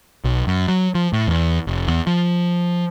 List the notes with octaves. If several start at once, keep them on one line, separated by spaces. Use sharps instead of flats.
B1
F#2
F#3
F3
A2
E2
F1
E2
F3